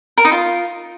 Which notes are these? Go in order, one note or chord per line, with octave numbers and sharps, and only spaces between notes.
A#4
D#4
F4